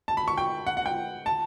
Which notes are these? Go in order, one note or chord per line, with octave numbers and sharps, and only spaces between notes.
A5
B5
C#6
G5
F#5
F#5
G5
A5